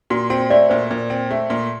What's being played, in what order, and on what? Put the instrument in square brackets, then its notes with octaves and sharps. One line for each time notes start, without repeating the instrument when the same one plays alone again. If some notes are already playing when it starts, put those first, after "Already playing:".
[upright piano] A#2 [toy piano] F#4
[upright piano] C4 [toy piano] F#4
[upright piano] A3 [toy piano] D5
[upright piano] A#2 [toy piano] C5
[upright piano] A#2
C4
A3
A#2